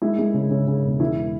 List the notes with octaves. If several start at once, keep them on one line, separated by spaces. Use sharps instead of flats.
G#3 E4
G#3
C#3
C#3
C#3
E1
E3 E4